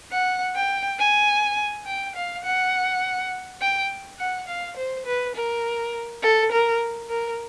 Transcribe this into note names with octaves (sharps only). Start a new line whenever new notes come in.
F#5
G5
G#5
G5
F5
F#5
G5
F#5
F5
C5
B4
A#4
A4
A#4
A#4